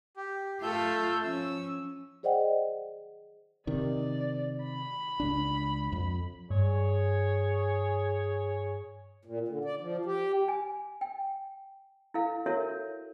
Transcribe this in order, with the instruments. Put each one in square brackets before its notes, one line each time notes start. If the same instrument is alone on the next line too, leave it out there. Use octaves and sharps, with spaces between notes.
[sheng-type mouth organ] G4
[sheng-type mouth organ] A3 E5 G6 [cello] F4 A4
[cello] F3 C#4 [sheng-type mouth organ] E6
[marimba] G#4 C5 D5 D#5 F#5 G5
[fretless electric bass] C3 D#3 [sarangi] D5
[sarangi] B5
[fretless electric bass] C#2 D4
F2
[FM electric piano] G2 [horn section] G#4 C#5
[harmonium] A#2
D3
D5
F3
G4
[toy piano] G#5
G5
E4 A4 F5
E4 F#4 A4 A#4 C#5 E5